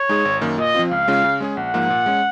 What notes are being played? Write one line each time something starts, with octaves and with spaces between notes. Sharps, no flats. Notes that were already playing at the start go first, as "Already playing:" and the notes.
Already playing: C#5
G#3 D#4 G#4
G#1
F#2 D#3 A#3
A#2 D#5
F3 C4 F4
C#2 F5
C#3 G#3 C#4 F4
C#3
G#3 C#4 G#4
A#1 F#5
G#2 F3 A#3 D#4
A#2
G#3 C#4